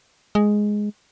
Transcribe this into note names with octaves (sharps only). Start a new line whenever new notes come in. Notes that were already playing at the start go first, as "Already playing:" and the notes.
G#3